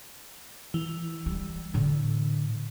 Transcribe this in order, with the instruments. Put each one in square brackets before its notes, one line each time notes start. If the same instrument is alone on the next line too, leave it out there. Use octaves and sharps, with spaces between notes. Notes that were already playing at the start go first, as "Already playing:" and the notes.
[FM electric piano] E3
[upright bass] G3
A2 D3